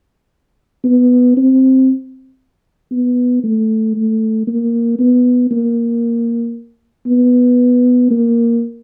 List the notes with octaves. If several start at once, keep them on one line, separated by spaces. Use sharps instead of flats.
B3
C4
B3
A3
A3
A#3
B3
A#3
B3
A#3